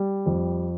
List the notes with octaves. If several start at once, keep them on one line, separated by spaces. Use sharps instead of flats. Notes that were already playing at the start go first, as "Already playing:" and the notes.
Already playing: G3
F2